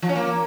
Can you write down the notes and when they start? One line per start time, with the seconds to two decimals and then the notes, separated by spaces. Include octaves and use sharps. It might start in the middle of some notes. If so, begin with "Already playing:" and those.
0.02 F3
0.09 C#4
0.15 A#3